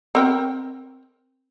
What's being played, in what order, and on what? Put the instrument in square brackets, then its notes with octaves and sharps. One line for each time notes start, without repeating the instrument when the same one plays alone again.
[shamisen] C4 A#4 G5